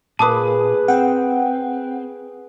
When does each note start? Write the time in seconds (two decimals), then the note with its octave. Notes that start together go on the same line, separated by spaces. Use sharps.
0.19 A#2 G#4 B4 A5 D6 D#6
0.88 C4 F#5 G5